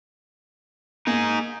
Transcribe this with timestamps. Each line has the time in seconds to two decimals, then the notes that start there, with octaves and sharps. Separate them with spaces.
1.07 A#3 D#4 G#4